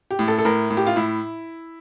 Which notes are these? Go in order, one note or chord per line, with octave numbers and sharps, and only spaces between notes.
G4
A2
A4
A4
A2 A#4
A2
G4
F4
A2 E4